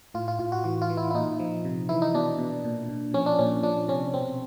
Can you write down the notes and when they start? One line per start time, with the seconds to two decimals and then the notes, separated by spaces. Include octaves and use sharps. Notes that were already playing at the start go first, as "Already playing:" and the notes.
0.14 A2 F4
0.28 F4
0.39 A2 F4
0.52 F#4
0.64 E3 F#4
0.82 F4
0.90 E3
0.97 E4
1.11 E4
1.14 A#2 D#4
1.39 F3
1.65 C3
1.89 E3 E4
2.02 D#4
2.14 B2 D4
2.38 B2
2.64 A#2
2.89 A#2
3.14 F3 C#4
3.26 D4
3.39 A#2 C#4
3.63 F3 D4
3.88 C3 C#4
4.14 B2 C4